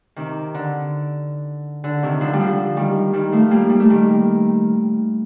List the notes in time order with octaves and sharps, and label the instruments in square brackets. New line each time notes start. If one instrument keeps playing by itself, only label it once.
[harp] C3 D#3
D3
D3
C3 D#3
D3 F3
G3
D3 F3
D#3 G3
D#3 G3
F3 A3
G3 A#3
G3
A3
D#3 G3